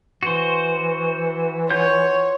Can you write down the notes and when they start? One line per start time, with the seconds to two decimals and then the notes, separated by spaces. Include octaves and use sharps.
0.23 E3 F#4 C5
1.71 F4 C#5 F#5 G6